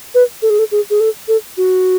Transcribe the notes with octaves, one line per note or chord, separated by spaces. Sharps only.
B4
A4
G#4
A4
G#4
G#4
A4
A4
F#4